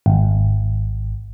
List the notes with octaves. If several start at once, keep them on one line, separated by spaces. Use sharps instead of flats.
G#1